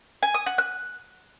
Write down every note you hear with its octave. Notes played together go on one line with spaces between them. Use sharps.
G#5
D#6
F#5
F#6